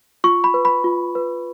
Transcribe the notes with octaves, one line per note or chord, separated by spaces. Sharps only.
F4 C#6
B5
B4
B5
F4
B4